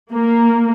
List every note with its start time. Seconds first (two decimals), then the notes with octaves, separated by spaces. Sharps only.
0.12 A#3